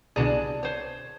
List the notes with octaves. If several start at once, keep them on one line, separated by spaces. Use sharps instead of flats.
C2 B2 D3 G#4 D5 A5
C5 C#5